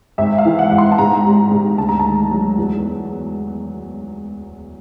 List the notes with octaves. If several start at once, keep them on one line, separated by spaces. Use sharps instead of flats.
G#1 E5
F5
E3
F#5
G#1
C6
A5
G#2 A#5
G3
G#2
D2 A5
A#5
A5
D#3
F#3
E2